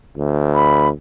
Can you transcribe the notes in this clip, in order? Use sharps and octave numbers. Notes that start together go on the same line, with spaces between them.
D2
B5